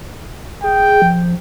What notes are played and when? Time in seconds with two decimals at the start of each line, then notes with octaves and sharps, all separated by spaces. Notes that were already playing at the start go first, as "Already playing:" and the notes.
0.64 G#4 G5
1.02 F3